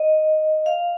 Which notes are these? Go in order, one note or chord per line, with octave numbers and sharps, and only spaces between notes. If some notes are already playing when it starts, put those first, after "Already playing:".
Already playing: D#5
F5